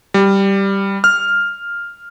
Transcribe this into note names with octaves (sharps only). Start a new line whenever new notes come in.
G3
F6